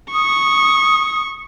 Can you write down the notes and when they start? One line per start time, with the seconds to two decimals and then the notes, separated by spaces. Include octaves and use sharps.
0.12 C#6 D#6